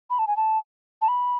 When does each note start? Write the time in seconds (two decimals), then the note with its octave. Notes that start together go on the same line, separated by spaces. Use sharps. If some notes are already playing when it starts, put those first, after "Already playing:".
0.10 B5
0.19 A5
0.27 G#5
0.37 A5
1.02 A5
1.08 B5